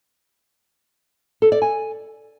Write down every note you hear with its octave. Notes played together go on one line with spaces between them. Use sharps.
A4
D5
G#5